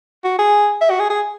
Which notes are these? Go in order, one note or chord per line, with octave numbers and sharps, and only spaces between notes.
F#4
G#4
E5
F#4
G#4
G#4